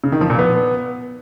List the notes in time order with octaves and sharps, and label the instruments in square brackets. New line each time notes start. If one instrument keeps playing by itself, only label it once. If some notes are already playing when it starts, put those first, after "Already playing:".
[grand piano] C#3
D#3
F3
A#2
B3